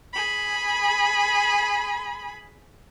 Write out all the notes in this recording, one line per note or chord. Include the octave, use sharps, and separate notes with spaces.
G#4 B5